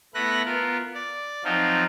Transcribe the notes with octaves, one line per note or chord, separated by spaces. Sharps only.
A3 B3 E4 B4 F#6 A#6
B3 F4 A#4
D5
F3 F#3 C4 D#4 F4